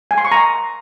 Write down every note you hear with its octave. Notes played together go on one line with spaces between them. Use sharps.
G#5
C6
C#6
A#5